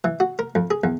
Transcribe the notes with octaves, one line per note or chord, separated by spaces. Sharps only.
E3
F#4
A#4
F2
G#4
E2